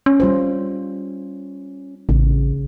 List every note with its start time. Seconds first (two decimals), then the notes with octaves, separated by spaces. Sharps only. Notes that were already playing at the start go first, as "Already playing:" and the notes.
0.06 C#4
0.20 G3 F4 C5
2.09 A1 C#3